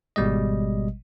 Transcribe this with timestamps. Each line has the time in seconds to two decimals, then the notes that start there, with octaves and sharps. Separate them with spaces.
0.16 G#1 B2 G3 G#3 D#5